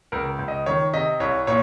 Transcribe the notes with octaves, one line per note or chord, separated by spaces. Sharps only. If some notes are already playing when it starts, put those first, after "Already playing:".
C#2 A#4
C#2
D#5
D#3 C#5
C3 D#5
C2 C#5
A#2 C#5